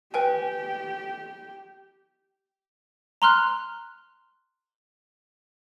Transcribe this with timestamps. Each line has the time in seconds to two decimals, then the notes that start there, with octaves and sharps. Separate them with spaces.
0.14 G4 B4 G5 G#5
3.22 A#5 C6 F6 F#6